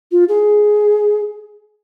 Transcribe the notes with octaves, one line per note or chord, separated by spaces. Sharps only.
F4
G#4